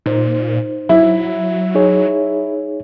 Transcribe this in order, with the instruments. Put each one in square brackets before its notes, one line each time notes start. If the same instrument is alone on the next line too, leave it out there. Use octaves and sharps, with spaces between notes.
[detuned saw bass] A#2 [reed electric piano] D#4 C5
[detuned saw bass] F#3 [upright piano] E4
[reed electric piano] D#4 G#4 C#5